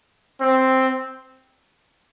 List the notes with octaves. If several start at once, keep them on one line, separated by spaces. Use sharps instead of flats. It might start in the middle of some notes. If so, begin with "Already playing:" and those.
C4